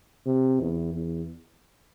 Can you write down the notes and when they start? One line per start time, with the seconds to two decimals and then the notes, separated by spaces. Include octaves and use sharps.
0.26 C3
0.60 E2
0.93 E2